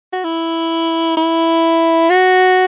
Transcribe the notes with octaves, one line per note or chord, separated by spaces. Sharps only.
F#4
E4
E4
F#4